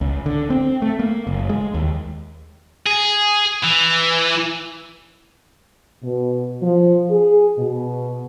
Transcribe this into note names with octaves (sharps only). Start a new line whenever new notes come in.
C#2
D3
C4
A3
A#3
F#1
G#3
D#2
G#4
E3
B2
F3
G#4
B2